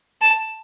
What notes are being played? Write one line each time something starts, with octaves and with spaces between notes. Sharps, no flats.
A5